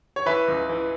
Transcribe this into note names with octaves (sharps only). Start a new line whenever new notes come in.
C#5
E3 B4 E5
C#2
E3